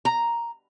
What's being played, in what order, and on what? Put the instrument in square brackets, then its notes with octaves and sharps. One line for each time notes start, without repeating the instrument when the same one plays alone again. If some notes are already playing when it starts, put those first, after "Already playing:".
[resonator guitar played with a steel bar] A#5